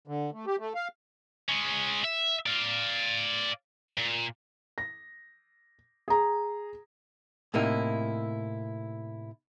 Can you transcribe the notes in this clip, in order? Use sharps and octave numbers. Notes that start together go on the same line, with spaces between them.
D3
A3
G4
A3
F5
G#3 C#4
E5
D5 F5
A#2
A#6
G#4 A#5
A2 C3 A#3 D#4 E4